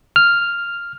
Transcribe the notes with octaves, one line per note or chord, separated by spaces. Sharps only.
F6